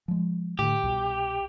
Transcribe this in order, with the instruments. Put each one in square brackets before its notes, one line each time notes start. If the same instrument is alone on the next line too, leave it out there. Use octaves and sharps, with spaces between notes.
[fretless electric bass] F3 G#3
[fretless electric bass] A2 D3 [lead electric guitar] G4
[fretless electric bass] C2 B2